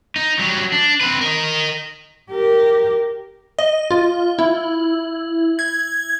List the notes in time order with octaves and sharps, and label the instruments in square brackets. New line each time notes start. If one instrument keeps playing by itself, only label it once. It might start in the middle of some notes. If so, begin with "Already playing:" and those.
[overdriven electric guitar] D#4
F#3 G3
D4
C4 B4
A#4 D#5
[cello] G4 A#4
[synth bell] D#5
F4
E4
G#6